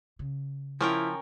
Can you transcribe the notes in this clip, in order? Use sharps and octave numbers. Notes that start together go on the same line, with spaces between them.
C#3
F3 C#4 E4 A#4 G5